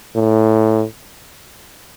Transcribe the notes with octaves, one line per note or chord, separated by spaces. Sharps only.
A2